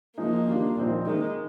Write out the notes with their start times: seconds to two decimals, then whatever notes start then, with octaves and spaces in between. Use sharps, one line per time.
0.18 F3 G#3 A#3 D#4
0.48 D#3 G3 D4 F4
0.76 A#2 F3 C4 D#4
1.05 D#3 G#3 A#3 D#4